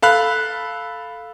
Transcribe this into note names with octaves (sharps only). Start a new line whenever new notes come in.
A4 F5 B5 F#6